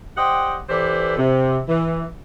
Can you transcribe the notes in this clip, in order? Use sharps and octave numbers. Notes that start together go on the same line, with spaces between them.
G4 C5 D5 D#5 F#5 G5
E3 G4 A4 B4 C5 D5
C3
E3